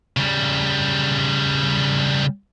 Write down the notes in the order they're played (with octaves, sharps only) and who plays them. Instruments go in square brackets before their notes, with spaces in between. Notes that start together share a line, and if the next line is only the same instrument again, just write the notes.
[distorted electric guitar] C#3 G3